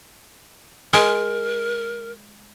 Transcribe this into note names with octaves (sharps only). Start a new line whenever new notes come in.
G#3 A#4